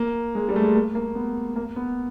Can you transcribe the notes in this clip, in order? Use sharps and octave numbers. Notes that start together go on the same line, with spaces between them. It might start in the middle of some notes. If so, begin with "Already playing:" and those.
Already playing: A#3
G#3
G3
A3
G#3
A#3
A#3
B3
A#3
B3